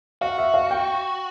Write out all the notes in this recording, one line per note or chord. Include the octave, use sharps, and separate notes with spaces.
F#4 F5
E5
F5
G5